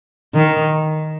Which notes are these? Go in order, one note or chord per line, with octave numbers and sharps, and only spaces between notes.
D#3